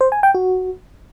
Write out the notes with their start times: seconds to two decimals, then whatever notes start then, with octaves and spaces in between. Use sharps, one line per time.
0.01 C5
0.12 G#5
0.23 G5
0.35 F#4